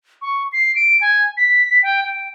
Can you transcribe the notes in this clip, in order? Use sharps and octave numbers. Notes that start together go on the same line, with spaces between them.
C#6
C7
D7
G#5
B6
G5
G5